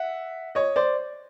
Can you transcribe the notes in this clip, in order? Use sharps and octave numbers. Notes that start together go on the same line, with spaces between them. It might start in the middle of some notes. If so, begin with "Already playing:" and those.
Already playing: E5 F#5
C#5 D#5
C5 D5